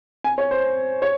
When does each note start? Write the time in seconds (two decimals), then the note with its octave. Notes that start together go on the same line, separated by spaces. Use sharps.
0.24 G#5
0.38 C#5
0.51 C5
1.02 C#5